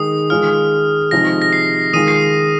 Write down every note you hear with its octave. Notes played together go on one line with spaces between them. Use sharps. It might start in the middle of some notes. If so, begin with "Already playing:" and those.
Already playing: D#3 G#3 D#4 D#6
D#3 G#3 F4 F6
C3 F3 G#3 D#4 A#6
A#6
C7
D#3 G#3 F4 D#6 D#7
C7